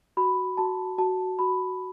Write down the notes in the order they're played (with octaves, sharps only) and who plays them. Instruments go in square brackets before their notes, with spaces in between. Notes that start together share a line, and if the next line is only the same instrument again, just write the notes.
[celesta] F#4 B5
F#4 A5
F#4 A5
F#4 B5